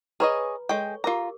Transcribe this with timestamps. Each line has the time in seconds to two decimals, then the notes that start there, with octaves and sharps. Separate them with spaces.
0.20 G#4 B4 C#5 D#5 A#5 B5
0.69 G#3 A4 C#5 G5 C#6
1.04 F4 G4 A#4 A#5 D6